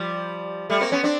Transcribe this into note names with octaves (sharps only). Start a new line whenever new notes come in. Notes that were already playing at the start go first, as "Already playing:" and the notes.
Already playing: F3 G3
G3 A3
A#3 C4
B3 C#4
C4 D4